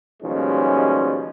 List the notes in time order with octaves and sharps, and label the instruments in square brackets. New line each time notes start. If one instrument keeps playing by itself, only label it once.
[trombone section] D#2 B2 F3 G3 G#3 C#4